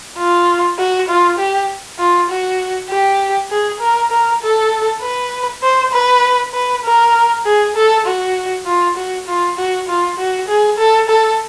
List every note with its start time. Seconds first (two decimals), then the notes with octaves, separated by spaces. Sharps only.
0.18 F4
0.78 F#4
1.08 F4
1.38 G4
1.99 F4
2.30 F#4
2.90 G4
3.50 G#4
3.81 A#4
4.11 A#4
4.42 A4
5.02 B4
5.63 C5
5.93 B4
6.54 B4
6.84 A#4
7.45 G#4
7.76 A4
8.06 F#4
8.66 F4
8.97 F#4
9.27 F4
9.57 F#4
9.88 F4
10.18 F#4
10.48 G#4
10.78 A4
11.09 A4